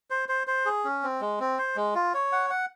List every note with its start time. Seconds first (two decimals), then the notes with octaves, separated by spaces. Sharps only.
0.10 C5
0.29 C5
0.47 C5
0.66 G#4
0.85 C#4
1.03 C4
1.21 G#3
1.40 C4
1.58 C5
1.76 G#3
1.95 F4
2.14 C#5
2.32 F#5
2.50 F#5